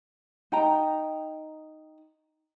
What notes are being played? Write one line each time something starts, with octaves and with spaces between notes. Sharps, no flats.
D#4 G5 A#5